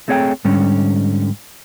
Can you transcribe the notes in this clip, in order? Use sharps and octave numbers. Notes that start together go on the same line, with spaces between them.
A3 C4 G#4 C#5 E5 G5
G#2 D3 G3 C#4